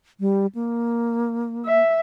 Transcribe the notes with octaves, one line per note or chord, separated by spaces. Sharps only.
G3
A#3
E5